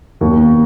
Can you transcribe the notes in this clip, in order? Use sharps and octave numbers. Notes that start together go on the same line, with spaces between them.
D#2